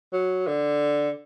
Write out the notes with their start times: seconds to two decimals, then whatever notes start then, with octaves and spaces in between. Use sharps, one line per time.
0.13 F#3
0.47 D3